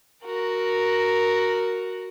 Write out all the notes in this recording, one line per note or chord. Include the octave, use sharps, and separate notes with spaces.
F#4 A#4